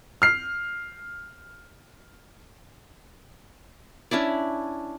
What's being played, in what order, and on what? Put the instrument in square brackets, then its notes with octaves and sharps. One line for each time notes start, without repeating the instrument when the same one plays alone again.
[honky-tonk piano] F6 C7
[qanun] C#4 D4 E4 D5